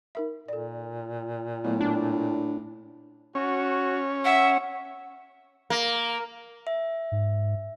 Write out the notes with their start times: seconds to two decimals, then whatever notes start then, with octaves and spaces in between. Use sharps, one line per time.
0.15 D#4 A#4 E5
0.48 A#2 A4 D5
1.64 A2 F#3 A3 B3
1.81 D4
3.35 C#4 F#4
4.25 E5 F#5
5.70 A#3
6.67 E5
7.12 G#2